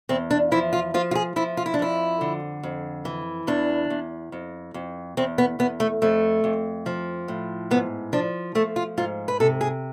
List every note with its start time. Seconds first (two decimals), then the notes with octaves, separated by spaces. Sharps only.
0.09 E2 C4
0.31 D4
0.52 F3 E4
0.73 F4
0.94 F3 F4
1.11 F4
1.15 G#4
1.36 F3 E4
1.57 F4
1.66 E4
1.74 D4
1.79 F2 E4
2.21 D3
2.63 F2
3.05 E3
3.47 E2 D4
3.90 E2
4.32 F2
4.74 F2
5.17 E2 C4
5.38 B3
5.59 E2 B3
5.80 A3
6.02 F2 A3
6.44 F2
6.86 F3
7.28 A2
7.71 G#2 B3
8.13 F3 D4
8.55 F3 A3
8.76 F4
8.98 G#2 F4
9.28 B4
9.40 C3 A4
9.61 G#4